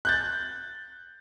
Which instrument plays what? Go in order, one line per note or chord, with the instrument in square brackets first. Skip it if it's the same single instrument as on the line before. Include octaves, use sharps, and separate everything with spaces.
[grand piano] F#6 G6 A6